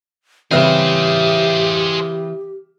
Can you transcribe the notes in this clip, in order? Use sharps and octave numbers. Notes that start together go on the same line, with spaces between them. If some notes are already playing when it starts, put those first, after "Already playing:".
C#3 E3 G3 C4 G4 G#4 C5 E5